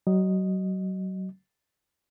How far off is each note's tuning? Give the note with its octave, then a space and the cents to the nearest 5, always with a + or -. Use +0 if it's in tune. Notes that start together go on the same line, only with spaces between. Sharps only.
F#3 +30 D#5 -5